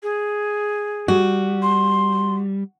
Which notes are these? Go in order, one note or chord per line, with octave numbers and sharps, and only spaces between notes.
G#4
G3 F#4
C6